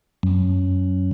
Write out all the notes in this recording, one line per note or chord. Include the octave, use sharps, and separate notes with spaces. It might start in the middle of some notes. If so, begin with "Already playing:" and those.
F#2